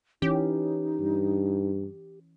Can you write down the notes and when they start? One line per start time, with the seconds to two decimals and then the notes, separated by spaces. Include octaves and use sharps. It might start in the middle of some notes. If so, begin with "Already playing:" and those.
0.22 E3 C#4 D#4 G4
1.01 G2